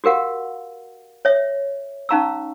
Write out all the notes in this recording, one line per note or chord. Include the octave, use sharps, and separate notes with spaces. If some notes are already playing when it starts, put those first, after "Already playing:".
F#4 G4 A#4 F5 F#5
C#5 E5
C#4 D#4 F5 A#5 C#6 E6